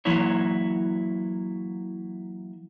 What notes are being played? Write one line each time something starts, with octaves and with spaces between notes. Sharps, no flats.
E3 F#3 A#3 E4 C#5